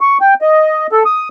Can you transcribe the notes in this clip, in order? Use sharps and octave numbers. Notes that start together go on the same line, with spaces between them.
C#6
G5
D#5
A4
D#6